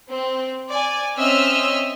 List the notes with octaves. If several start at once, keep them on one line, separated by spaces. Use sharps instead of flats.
C4
D5 G#5
C4 C#4 D#5 E5 E6 F6